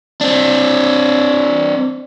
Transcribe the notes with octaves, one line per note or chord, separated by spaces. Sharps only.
C4 D4